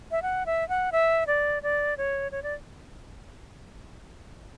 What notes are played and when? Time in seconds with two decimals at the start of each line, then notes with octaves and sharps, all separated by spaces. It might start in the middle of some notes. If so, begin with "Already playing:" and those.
0.11 E5
0.22 F#5
0.46 E5
0.69 F#5
0.92 E5
1.27 D5
1.63 D5
1.98 C#5
2.32 C#5
2.43 D5